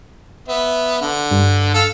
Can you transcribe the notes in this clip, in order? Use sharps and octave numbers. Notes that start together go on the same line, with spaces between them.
B3 E5
D3
G2
A4 F5 E6